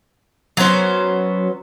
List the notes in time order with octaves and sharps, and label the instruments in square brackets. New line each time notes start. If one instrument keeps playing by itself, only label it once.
[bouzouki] F#3 B3 C#4 C5